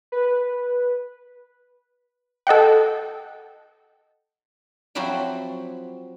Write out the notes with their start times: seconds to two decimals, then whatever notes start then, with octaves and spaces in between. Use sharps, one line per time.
0.12 B4
2.47 A4 D#5 F#5 G5
4.95 F3 F#3 C4 E4 F#4 G4